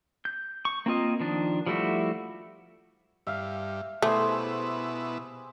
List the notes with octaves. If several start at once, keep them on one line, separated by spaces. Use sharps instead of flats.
G6
C#6
A#3 C4 F4 D#5
D#3 F3 D4
F3 G3 A3 E4 F#4
G2 E5 F5
B2 A3 E4 G4 G#4 C5